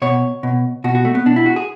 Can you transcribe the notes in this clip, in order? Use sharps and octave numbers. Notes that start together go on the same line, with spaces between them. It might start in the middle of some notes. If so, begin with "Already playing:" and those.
B2 C#5
B2
B2 F#4
F#4
A3
B3
B2 D4
E4
F#4
G#4